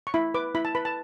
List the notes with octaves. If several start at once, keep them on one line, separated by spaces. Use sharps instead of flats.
C#6
E4 B5
B4 D6
E4 B5
A5
B4 B5
A5